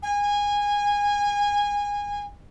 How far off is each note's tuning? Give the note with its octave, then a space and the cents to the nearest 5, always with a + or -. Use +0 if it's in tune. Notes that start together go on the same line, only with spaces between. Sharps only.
G#5 -20